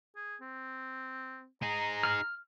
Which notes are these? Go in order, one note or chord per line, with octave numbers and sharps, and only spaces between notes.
G#4
C4
D#4 G#4 A#5
F6